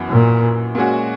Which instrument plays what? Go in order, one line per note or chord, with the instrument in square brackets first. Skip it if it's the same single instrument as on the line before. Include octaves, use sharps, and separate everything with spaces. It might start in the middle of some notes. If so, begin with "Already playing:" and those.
Already playing: [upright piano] F#2 E3 B3 F#4
[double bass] A#2
[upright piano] A#2 G#3 C#4 F#4